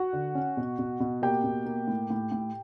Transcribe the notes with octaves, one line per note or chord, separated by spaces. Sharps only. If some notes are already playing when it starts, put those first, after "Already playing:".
Already playing: F#4 F#5
D3
C#4
B2
B2
B2
A#3 G4 G5
B2
A#3
A2
A2
A2